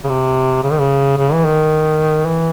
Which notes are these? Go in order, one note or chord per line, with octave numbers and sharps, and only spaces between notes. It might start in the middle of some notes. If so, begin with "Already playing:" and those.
C#3
C3
C#3
D#3
C#3
C#3
E3
D#3
E3